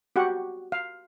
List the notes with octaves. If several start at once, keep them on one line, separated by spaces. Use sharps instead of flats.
F#4 G4 F#5
F5